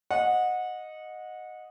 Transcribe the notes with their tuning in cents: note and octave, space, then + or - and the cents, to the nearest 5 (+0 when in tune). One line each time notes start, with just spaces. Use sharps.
D#5 -5 F#5 -25